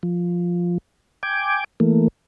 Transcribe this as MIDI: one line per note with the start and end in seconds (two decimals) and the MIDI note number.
0.03 0.78 53
1.23 1.64 79
1.23 1.64 80
1.23 1.64 86
1.80 2.08 52
1.80 2.08 57
1.80 2.08 58